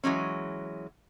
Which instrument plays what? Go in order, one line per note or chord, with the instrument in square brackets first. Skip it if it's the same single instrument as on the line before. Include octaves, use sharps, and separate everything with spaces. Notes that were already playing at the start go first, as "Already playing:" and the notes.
[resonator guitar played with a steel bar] E3 F#3 G#3 C#4